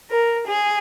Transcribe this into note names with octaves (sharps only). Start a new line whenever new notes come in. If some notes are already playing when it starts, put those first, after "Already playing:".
A#4
G#4